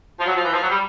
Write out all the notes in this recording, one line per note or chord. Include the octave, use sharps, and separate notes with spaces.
F3
F#3
F3
E3
F3
F#3
G3